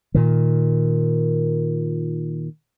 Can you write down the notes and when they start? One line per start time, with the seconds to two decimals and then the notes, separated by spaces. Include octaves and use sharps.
0.14 A#2 D#3